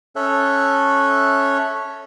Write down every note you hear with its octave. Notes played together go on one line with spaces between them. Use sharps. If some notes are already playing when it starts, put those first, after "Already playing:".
C#4 A4 C#5 E5 F#6